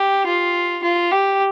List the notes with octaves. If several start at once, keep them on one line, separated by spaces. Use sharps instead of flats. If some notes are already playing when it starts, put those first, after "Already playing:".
Already playing: G4
F4
F4
G4